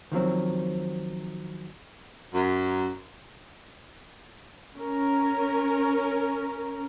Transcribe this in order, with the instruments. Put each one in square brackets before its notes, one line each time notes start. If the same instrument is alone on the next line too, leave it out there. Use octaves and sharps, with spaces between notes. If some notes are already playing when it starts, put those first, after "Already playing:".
[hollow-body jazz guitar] D#3 F3 F#3 C4
[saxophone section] F#2
[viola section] C#4 A#4